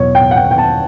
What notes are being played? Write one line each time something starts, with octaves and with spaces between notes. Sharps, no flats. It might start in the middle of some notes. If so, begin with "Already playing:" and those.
Already playing: E2 B2 F#3 C#5
G5
F#5
G5
G5
A5